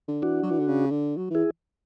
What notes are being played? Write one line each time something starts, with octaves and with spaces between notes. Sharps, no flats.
D3
E3 D4 F#4
F#3
E3
D3
C#3
D3
F#3
E3 E4 G#4